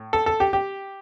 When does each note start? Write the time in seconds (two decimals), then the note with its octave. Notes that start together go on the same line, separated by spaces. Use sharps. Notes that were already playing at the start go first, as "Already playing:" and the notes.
Already playing: A2
0.13 A4
0.26 A4
0.40 G4
0.53 G4